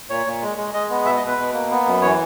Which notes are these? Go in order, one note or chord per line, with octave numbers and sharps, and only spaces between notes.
A#2 C#5
A#2
G#3
G#3
G#3 D#5
B3
B2 E5
D#5
B2 B4
B2
A#3
B3
F#2
E3 C#5